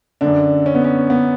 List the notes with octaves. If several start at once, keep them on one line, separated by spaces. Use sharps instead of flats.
F#2 D3 D4
C#4
B3
C#4
B3